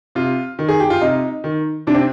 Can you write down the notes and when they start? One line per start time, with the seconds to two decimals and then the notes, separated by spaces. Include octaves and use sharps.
0.15 C3 F4
0.59 D#3
0.69 G#4
0.80 G4
0.90 F4
1.01 C3 D#4
1.44 D#3
1.87 C3 D4
1.95 C4